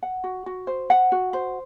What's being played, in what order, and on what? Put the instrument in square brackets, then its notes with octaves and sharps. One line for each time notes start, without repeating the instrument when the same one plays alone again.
[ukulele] F#5
F#4
F#4
C5
F#5
F#4
C5